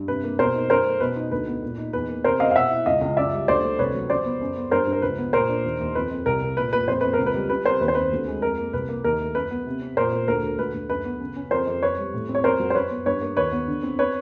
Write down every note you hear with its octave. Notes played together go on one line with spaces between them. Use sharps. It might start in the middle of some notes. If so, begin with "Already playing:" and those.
Already playing: G2
C3 B4
A#3
B2 A#4 C5
D#4
F#2 A#4 C5
A3
B2 B4
D#4
D2 B4
B3
A#2
D#4
E2 B4
A#3
C3 A#4 C5
C#4 D#5 F5
F5
B2 E5 F#5
E4
C#2 D#5 F5
C#2
F#2 D5 E5
G3
D2 C5 D5
D2
C2 B4 C#5
F#3
C#3 C5 D5
B3
F#2
B3
G2 A#4 C5
G2
A#4
C#2 B4
B3
A#2 A#4 C5
D4
D#2
D#2
F2 B4
F2
C2 A#4
C2
A#2 B4
A#2 B4
F2 C5
F2 B4
A#4
C#2
B4
G3
C#3 B4
C4 A#4 C5
D#2 B4
C5
C4 B4
D2
G#3
F2 A#4
A#3
C2 B4
A#3
D#2 A#4
A3
F#2 B4
B3
C3
C4
A#2 A#4 C5
A#2
D2 A#4
D2
D2 B4
D2
F#2 B4
B3
C#3
C#4
F2 A#4 C5
F2
F2 B4 C#5
G3
A2
C4
C#5
F2 A#4 C5
F#3
C5
F#2 B4 C#5
B3
G2 B4 C#5
A#3
D#2 B4 C#5
B3
D3
C4
B4 C#5